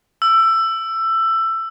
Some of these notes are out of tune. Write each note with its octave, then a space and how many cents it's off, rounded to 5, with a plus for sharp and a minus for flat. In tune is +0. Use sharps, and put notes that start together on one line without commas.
E6 +15